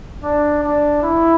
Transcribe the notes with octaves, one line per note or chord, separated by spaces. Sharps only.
D4
D4
E4